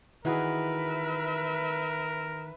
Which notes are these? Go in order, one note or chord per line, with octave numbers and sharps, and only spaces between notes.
D#3 E3 F#4 G#4 A#4 B4 E5